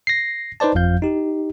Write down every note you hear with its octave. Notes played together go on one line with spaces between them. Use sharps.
A#6 C7
D#4 B4 C5 D5 A5
G1 F2 F3 F5 G6
D#4 G4